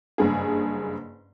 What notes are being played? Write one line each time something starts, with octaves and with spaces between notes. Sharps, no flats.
F#1 G2 G#4